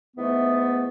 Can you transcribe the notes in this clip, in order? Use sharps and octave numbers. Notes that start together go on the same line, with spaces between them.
G#2 E3 A3 B3